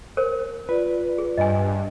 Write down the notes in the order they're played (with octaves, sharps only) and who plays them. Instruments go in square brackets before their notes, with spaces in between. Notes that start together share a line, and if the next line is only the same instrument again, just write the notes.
[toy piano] A#4 C5
[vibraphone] F4 D5 [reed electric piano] B4
[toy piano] G#4
[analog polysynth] G2 [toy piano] D#5 G#5